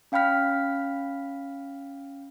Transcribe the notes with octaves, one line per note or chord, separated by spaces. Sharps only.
C#4 F5 G5 B5 F6 B6